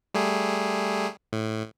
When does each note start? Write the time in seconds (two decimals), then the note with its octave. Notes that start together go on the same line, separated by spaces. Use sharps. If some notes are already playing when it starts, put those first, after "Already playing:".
0.14 G3 A3 G#4
1.33 A2